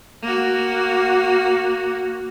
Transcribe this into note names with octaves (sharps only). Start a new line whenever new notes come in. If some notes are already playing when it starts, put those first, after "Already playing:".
A#3 F#4